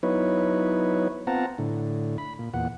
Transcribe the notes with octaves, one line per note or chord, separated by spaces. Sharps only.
F#3 B3 D#4 E4 B4 C#5
B3 C4 F4 F#5 A5 A#5
A2 D3
B5
A#2
E2 A#2 F#5